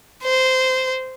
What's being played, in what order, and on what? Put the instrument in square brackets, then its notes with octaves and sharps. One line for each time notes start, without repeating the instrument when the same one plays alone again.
[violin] C5